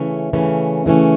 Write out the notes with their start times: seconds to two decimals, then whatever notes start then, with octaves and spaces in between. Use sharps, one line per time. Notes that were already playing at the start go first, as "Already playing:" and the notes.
Already playing: C#3 E3 A3 C#4
0.33 C#3 E3 A3 C#4
0.86 C#3 E3 A3 C#4